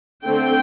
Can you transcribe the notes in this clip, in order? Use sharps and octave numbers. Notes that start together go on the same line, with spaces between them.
D3 A3 C4 G5